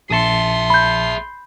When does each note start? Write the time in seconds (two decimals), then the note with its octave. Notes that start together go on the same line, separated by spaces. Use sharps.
0.10 A#1 G#4 E5 A5 C6 C#7
0.70 B5 G6